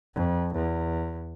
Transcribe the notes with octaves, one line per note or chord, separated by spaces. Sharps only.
F2
E2